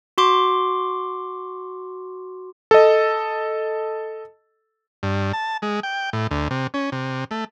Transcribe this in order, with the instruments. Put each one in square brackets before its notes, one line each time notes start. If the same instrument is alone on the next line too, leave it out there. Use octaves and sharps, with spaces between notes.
[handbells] F#4 C6 D6
[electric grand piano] A4 D#5
[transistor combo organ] G2
A5
G#3
G5
A2
D2
C3
C#4
C3
A3